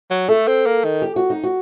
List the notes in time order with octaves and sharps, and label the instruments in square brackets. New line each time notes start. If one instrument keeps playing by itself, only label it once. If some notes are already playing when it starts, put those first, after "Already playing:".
[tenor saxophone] F#3
[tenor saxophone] A3 [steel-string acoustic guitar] A4
[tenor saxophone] C4
A#3
D#3
[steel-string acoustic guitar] G4
F#4
D#4
F#4